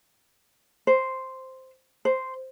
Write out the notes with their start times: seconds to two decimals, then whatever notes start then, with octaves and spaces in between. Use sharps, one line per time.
0.87 C5
2.05 C5